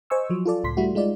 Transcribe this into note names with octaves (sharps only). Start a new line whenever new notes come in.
C5 D#5 G#5 C#6 E6
F3 F#3
F4 A4 D5
C#2 A2 C6 B6
G3 A3 E4 F#4
G#3 D#4 F4 D5